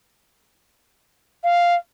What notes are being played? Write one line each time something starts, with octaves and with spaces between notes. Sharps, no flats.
F5